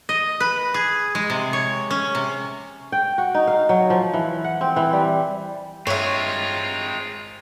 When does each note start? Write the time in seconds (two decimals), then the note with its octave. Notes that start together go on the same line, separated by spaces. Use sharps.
0.09 D#5
0.40 B4
0.74 G#4
1.15 G#3
1.30 C3
1.53 C#5
1.90 C#4
2.15 C3
2.92 G5
3.18 F#4
3.34 D#4
3.47 F5
3.69 F#3
3.90 F3
4.13 E3
4.44 F#5
4.61 C4
4.76 E3
4.93 G3
5.87 G2 G#3 C4 F4 A#4 C#5 E5